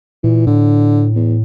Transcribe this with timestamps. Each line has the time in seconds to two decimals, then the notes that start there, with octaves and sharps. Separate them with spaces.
0.24 A#2 E3
0.46 A2 D3
1.15 E2